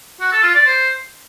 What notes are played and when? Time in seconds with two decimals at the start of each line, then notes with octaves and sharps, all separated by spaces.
0.20 F#4
0.32 A4
0.43 F4
0.55 D5
0.66 C5